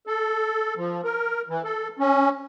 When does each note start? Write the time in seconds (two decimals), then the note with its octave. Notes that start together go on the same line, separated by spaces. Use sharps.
0.07 A4
0.77 F3
1.04 A#4
1.49 E3
1.64 A4
1.99 C#4